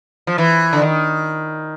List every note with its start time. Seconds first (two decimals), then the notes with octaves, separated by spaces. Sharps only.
0.27 F3
0.38 E3
0.73 D3
0.82 D#3